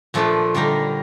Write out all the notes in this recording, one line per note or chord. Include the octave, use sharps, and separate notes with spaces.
A#2 F3 A3 D4
D3 G3 A#3 D#4